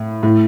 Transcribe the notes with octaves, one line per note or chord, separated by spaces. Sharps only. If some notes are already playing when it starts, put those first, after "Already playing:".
Already playing: A2
A2